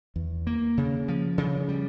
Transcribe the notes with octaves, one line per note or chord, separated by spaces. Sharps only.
E2
A#3
C#3
F3
C#3
G3